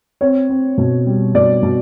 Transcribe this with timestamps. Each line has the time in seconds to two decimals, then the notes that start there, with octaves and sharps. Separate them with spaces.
0.21 C4 C#5
0.49 C4
0.78 B2
1.07 G3
1.35 B2 D5
1.63 B2